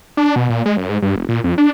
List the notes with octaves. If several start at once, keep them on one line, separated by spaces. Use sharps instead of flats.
D4
B2
A#2
G#3
F#2
G#2
G2
F1
A#2
F2
D4